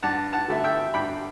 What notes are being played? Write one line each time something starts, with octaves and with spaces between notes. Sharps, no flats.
G2 F#5 A5
F#5 A5
D3 A3 E4
E5 G5
G2 G5 B5